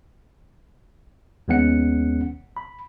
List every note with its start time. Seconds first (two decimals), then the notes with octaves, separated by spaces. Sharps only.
1.48 D#2 G#3 B3 C#4 F#5 C#7
2.57 B5